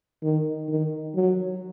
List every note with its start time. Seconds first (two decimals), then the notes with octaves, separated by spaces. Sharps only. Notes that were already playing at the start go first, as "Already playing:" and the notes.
0.23 D#3
0.69 D#3
1.15 F#3